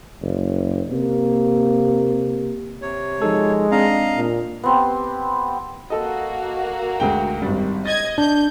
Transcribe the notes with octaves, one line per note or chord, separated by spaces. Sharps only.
F#1
C3 A#3
C3 C#5
F3 G#3 D#4 A4
C4 D4 D#5 F5 A#5
A#2
B3 C4 G4
A#3 F#4 A4 D#5
D2 G#3 G5
G#1 G3
D#5 G#6 A6
D4 G6